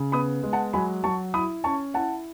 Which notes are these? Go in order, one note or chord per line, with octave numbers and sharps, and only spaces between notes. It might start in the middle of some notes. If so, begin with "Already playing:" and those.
Already playing: C#3
B3 B5 D#6
G#3
F#5 A5
F#3 G#5 B5
F#3 A5 C#6
E4 B5 D#6
C#4 A5 C#6
E4 F#5 A5